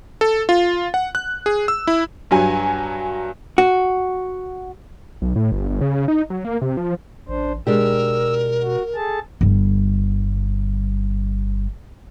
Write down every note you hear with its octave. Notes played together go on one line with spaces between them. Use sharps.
A4
F4
F#5
F#6
G#4
E6
E4
G2 F#3 G#5
F#4
B1
A2
G1
G1
C#3
D#4
F#3
A#3
C3
F3
A1 D4 C5
B2 G#3 D4 G4 A#4 E6
F#4
G#4 A4 A5
G1 G3